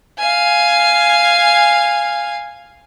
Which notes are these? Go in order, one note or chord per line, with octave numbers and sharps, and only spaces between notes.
F5 G#5